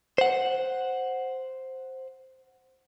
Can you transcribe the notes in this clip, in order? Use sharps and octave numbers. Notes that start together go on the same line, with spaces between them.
C5 F#5